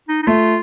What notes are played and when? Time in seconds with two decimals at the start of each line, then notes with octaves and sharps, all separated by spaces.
0.09 D#4
0.22 D#4
0.27 A3 F4